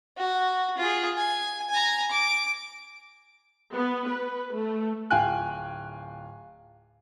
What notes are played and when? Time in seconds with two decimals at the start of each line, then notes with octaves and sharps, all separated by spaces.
0.17 F#4
0.78 F4 G#4
1.18 G#5
1.70 G#5 A#5
2.11 D6
3.74 B3
4.08 B4
4.55 A3
5.10 D1 F4 G5 G#5 F#6